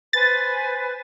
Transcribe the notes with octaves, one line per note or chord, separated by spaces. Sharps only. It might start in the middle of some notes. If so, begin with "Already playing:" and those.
B4 C5 G#5 A6